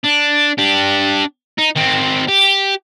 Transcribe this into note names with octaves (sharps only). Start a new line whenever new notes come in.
D4
D4 G4
D#4
D#3 C4
G4